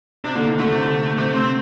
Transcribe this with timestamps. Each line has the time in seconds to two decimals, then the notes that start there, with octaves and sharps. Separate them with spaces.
0.24 C3 D4
0.35 D3 A#3
0.47 D#3
0.59 D3 A3
0.71 C3
0.82 D3
1.18 C3 A3
1.34 C4